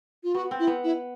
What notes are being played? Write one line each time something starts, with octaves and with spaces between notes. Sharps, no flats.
F4
B3 F#4
C4
E4
B3
E4